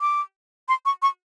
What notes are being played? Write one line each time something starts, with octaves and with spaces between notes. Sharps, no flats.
D6
C6
C#6
C#6